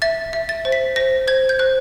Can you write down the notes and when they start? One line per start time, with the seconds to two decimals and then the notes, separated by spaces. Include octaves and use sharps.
0.02 E5 A6
0.33 E5
0.49 A6
0.65 C5
0.72 B6
0.96 C5 A#6
1.28 C5 G#6
1.49 G6
1.59 C5 F#6